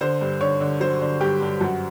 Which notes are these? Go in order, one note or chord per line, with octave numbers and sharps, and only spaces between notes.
D3 C5
G2
D3 C#5
D3
F#3 C5
D3
G2 G4
G2
F#2 F#4